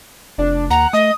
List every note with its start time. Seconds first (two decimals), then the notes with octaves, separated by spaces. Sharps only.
0.38 F1 D4
0.70 D#2 F#5 A#5
0.93 A3 D#5 D#6